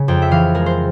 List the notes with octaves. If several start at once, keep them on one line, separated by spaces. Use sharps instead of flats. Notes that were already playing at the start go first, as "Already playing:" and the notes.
Already playing: C#3
F2 G5
E5
E3 F5
G#3 A#4
C5